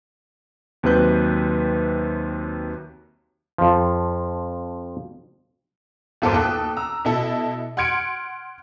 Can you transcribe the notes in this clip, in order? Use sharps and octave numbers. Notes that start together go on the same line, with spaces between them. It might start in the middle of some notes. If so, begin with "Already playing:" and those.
D#2 C3 F#3 B4 F#6 G6
F2 F3
G1 E2 A4 A#4 C5 D6
D#2 A4 D#6 F#6
A#5 E6
B2 E4 A4
F#5 C6 F6 G#6 C#7 D7